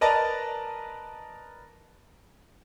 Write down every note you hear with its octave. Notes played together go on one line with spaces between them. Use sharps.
A#4 B4 D5 D#5 A5 A#5